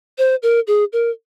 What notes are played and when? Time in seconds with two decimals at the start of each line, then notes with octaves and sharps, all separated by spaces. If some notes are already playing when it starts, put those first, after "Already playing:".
0.18 C5
0.43 A#4
0.67 G#4
0.93 A#4